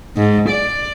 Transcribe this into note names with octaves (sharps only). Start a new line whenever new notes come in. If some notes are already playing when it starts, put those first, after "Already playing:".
G#2
D5